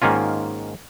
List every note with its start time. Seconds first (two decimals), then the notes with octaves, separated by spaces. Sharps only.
0.02 G#2 D#3 A#3 C#4 F4